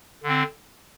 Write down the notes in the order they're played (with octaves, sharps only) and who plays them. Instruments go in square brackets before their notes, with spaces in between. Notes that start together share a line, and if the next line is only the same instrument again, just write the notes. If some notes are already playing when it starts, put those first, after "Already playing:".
[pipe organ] D3 C4